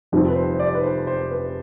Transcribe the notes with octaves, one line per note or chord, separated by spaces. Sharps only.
F1 F2 C3 F3 C4
B4
C5
C5
D5
B4
C5
C5
B4